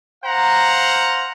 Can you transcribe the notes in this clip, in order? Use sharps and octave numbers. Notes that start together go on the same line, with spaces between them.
C5 F5 F#5 A#5